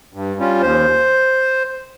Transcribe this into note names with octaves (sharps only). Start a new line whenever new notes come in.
G2
G3 C#4 F4
D#2 C5